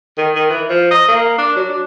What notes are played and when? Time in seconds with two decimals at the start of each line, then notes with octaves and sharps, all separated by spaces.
0.18 D#3
0.35 D#3
0.50 E3
0.69 F3
0.91 D#5
1.08 A#3
1.38 D4
1.56 F#3
1.69 D4